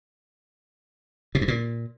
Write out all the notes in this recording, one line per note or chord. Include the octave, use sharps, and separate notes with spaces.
B2
G2
A#2